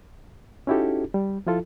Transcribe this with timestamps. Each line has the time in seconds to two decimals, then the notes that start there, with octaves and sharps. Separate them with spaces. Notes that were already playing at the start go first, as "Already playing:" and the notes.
0.67 C#4 D#4 E4 F#4 G4 A4
1.14 G3
1.47 F3 E4 F4 A4